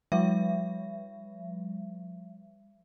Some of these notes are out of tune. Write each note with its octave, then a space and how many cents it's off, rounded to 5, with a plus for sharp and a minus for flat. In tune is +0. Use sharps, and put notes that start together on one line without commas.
F3 +45 G#3 -45 E5 +35